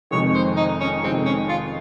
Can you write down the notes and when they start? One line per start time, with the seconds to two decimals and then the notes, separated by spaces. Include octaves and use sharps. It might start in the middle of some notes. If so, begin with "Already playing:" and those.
0.11 F1 F2 D#3 G#3 C#5
0.34 C5
0.57 D#4
0.80 C#4
1.03 F1 F2 D#3 G#3 C4
1.25 C#4
1.49 F4